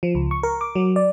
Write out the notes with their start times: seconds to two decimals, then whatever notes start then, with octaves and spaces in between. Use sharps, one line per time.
0.03 F3
0.15 C#2
0.31 C#6
0.43 A#4
0.61 D6
0.75 F#3
0.96 D5